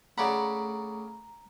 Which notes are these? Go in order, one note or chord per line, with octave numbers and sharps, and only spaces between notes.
C#3 A3 D5 F#5 A#5 B5